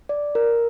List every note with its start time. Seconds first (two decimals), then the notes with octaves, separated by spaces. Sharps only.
0.09 D5
0.35 A#4